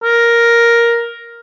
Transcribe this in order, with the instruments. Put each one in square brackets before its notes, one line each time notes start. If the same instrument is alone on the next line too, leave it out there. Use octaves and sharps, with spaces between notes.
[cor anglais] A#4